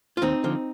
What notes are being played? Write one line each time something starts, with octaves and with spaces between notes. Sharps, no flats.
F4
D#2 C4 D#4
D3 F3